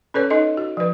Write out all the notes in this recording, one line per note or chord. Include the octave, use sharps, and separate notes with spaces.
C#4 A4 B4 C#5
D#4 A4 D#5
F#4
F3 B4